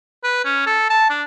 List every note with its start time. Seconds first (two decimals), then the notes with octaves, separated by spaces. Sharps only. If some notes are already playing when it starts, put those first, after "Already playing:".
0.24 B4
0.45 C#4
0.66 A4
0.90 A5
1.10 D4